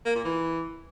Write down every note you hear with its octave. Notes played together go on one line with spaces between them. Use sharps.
A#3
A#2
E3